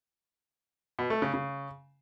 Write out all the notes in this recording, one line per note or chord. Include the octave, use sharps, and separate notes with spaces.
B2
A3
C#3
C#3